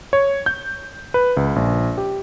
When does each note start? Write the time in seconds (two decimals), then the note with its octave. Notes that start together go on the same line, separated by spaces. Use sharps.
0.13 C#5
0.46 G6
1.14 B4
1.37 C#2
1.56 A#1
1.98 G4